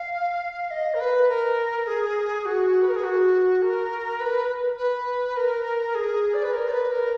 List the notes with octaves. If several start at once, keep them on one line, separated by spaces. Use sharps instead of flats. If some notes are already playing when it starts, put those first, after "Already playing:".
Already playing: F5
D#5
A#4
B4
A#4
G#4
F#4
B4
A#4
G#4
F#4
A#4
B4
B4
A#4
G#4
D5
B4
A#4
D5
B4
A#4